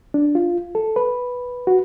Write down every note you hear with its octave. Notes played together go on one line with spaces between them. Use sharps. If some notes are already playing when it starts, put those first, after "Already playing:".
D4
F4
A4
B4
F#4